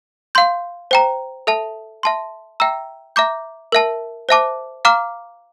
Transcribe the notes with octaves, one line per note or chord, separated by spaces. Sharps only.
F5 C6 G6
C5 G5 A#5
A4 E5 A5
E5 A5 C6
E5 G5 A#5 E6
E5 A#5 D6 G6
A#4 E5 A5
C5 E5 A5 D6
F5 A#5 D6 F6